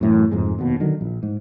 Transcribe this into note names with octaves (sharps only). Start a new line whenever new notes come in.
F#2 A2 E3
F1 F2 G#2 G#3
F1 D#2 B2
D3 D#3 F#3
A#1
G#2